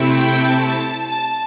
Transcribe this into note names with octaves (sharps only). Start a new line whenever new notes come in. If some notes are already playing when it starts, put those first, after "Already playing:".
Already playing: C3 A3 C4 E4
G5
A5
A5